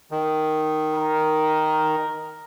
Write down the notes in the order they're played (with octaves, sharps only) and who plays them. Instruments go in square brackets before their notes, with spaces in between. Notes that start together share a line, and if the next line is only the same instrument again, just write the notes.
[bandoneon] D#3
[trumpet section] A#4